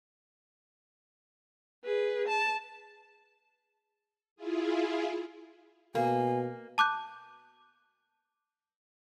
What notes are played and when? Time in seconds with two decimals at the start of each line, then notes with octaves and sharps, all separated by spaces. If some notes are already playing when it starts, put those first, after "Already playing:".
1.85 G#4 B4
2.28 A5
4.36 E4 F4 G#4
5.95 B2 A#3 G#5
6.78 A5 D6 F#6 G6